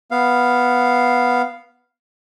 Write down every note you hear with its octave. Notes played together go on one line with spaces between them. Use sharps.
B3 F5